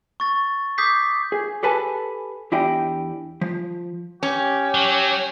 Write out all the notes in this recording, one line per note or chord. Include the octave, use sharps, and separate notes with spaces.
C#6 A6
D6 D#6 G6 B6 C7
G#4
G4 A4 B4 G#5 A5
E2 D4 E4 G4 D#5 G5
F3
C#4 G4
F#3